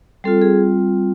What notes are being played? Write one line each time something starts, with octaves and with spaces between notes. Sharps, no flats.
G3 C4 F4 A4
G#4